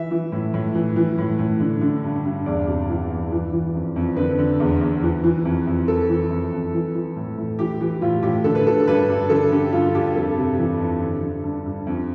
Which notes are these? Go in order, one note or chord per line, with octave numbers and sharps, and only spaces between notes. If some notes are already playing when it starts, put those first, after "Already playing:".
Already playing: E3 E5
E3
A2
A2
E3
E3
A2
A2
D3
D3
G2
G2
E2 D5
C3
E3
E2
E3
E3
F2
F2
D3 B4
D3
E2
E2
E3
E3
F2
F2
E3 A4
E3
F2
F2
E3
E3
A2
A2
E3 G4
E3 G4
A2 F4
A2 G4
D3 A4
B4
D3 A4
G2 B4
G2
D3 A4
D3 G4
G2 F4
G2 G4
F2 A4
C3
E3
F2
D3
D3
G2
G2
F2